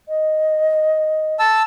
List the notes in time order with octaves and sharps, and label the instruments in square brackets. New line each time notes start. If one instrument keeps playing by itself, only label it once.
[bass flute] D#5
[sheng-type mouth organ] A5 E6